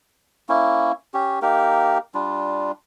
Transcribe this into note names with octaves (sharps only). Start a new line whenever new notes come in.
A#3 C#4 E4
C#4 G4
A#3 D#4 G4 A#4
G3 D4 F4